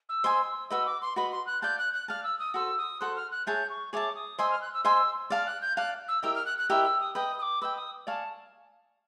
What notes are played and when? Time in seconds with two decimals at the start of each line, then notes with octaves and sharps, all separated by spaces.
0.09 E6
0.24 C5 D#5 G#5 C6
0.70 F#4 B4 D#5 E6
0.86 D6
1.01 C6
1.16 F#4 B4 D#5 B5
1.31 C6
1.46 F#6
1.62 D5 F5 A5 G6
1.78 F#6
1.93 F#6
2.08 D5 F5 A5 F6
2.23 E6
2.39 D#6
2.54 F#4 A4 C5 E6
2.78 D#6
3.00 F#4 A4 C5 F#6
3.16 F6
3.31 F#6
3.46 G#4 C#5 E5 A5 G6
3.69 C#6
3.93 G#4 C#5 E5 A5 D6
4.15 D#6
4.38 C5 D#5 G#5 C6 E6
4.50 F6
4.61 F#6
4.73 E6
4.85 C5 D#5 G#5 C6 E6
5.30 D5 F5 A5 F6
5.46 F#6
5.61 G6
5.77 D5 F5 A5 F#6
6.08 E6
6.23 E4 G4 A#4 D#5 E6
6.35 F6
6.45 F#6
6.58 F#6
6.69 E4 G4 A#4 D#5 E6
6.84 E6
7.00 D#6
7.15 B4 D#5 G5 D#6
7.38 D#6
7.42 D6
7.61 B4 D#5 G5 E6
7.76 D#6
8.07 D5 F5 G#5 A5 C#6